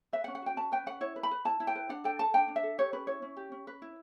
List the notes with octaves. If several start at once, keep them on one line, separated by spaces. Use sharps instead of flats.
B4 E5
F#5
C#4
F#5
F#4 G5
C#4 A5
B4 G5
C#4 F#5
E4 C#5
B4
B5
B4
E4 A5
E4
G5
B4
D4 F#5
A4 G5
A4 A5
D4 G5
D4
E5
A4
G4 C#5
C#4 B4
E4 C#5
C#4
G4
C#4
B4
E4